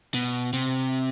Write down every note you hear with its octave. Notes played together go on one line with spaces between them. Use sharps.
B2
C3